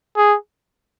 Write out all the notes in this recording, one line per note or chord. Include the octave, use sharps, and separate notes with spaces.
G#4